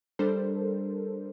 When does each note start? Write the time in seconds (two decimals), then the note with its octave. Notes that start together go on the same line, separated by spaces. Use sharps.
0.19 G3 D4 A4 A#4 C5